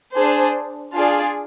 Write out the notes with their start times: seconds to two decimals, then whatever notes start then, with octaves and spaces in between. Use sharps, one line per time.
0.14 D4 G#4 C5
0.94 D4 F4 G#4 D5